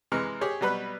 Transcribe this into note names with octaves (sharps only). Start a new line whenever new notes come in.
C3 E3 G#3 A#5 F6
G4 G#4 C#5
B2 F#3 G3 B4 B5 F#6